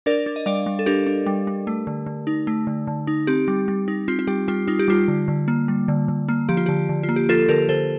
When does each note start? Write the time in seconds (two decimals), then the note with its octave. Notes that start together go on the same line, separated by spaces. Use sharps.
0.06 D4 A#4 D5
0.26 D4
0.36 D#5
0.46 G3 D5 F5
0.66 G3
0.79 A4
0.86 D4 G4 A#4
1.07 D4
1.26 G3
1.47 G3
1.67 A3
1.87 D3
2.06 D3
2.27 D#4
2.47 A3
2.67 D3
2.87 D3
3.07 D#4
3.27 C4 G4
3.48 G3
3.68 G3
3.88 D#4
4.08 C4 F4
4.19 F4
4.27 G3 G4
4.48 G3 F4
4.68 D#4 F4
4.79 G4
4.88 G3 F4
5.08 D3
5.28 D3
5.48 A#3
5.68 G3
5.88 D3
6.08 D3
6.29 A#3
6.49 F3 G4
6.57 F4
6.66 D3 G4
6.89 D3
7.03 F4
7.09 A#3
7.16 G4
7.29 F3 F4 A4
7.49 D3 G4 A#4
7.69 D3 A4 C5